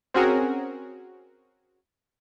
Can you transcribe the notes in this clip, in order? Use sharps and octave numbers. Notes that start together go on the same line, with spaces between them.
C4 C#4 F#4 G#4 A#4